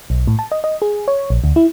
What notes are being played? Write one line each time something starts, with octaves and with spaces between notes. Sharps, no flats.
B1
A2
A5
D#5
D#5
G#4
C#5
A#1
D2
E4